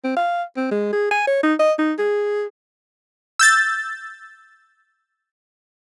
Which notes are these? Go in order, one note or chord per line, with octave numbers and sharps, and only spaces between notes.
C4
F5
C4
G#3
G#4
G#5
C#5
D#4
D#5
D#4
G#4
E6 G6 A6